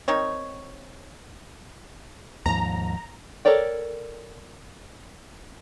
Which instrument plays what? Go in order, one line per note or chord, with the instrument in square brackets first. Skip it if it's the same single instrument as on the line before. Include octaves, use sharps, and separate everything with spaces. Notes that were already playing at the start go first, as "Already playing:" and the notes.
[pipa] D#3 C4 D#4 C#5
[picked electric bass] D#2 G#2 F3 [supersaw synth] A#5
[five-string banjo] A4 A#4 C#5 D5 G5